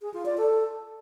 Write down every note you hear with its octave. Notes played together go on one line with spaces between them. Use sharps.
G#4
F4
D5
A4